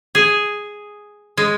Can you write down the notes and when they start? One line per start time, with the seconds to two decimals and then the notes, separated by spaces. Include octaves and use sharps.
0.15 G#4
1.37 G#3